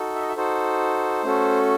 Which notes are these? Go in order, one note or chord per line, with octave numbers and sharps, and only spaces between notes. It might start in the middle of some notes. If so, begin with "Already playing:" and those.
Already playing: D#4 F#4 A4
E5
D#5
E5
D#4 F#4 A4 C5
A3 C#4 F#4 A4